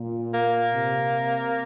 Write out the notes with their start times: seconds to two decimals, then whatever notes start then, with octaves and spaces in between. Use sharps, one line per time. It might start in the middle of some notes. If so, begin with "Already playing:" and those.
Already playing: A#2
0.34 A#3
0.74 C3